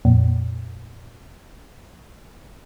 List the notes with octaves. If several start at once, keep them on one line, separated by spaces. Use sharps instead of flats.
F2 A#2